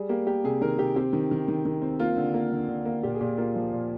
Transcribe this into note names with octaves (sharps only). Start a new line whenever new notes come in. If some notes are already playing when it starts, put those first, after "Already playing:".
Already playing: G3 G#4
A#3 G4
A#3 G4
C3 G#4
D#3 A#4
C3 G4
C4 G4
D#3
D#3
D#3
D#3
C4
A#3 F4
D3
A#3
D3
D3
A#3
A#2 G4
G#4
A#2 G4
A#3 F4
F3
A#2